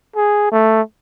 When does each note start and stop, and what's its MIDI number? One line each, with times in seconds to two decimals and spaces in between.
0.16 0.49 68
0.52 0.82 57